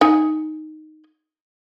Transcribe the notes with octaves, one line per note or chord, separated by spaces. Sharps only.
D#4 G#5